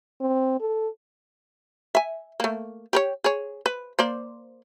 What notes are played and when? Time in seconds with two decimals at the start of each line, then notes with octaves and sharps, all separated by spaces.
0.21 C4
0.60 A4
1.95 E5 G#5
2.40 A3 A#3
2.93 G4 A#4 C#5
3.24 G#4 C#5
3.66 B4
3.99 A#3 C5 D5